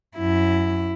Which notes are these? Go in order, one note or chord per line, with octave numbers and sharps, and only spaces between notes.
F#2 E4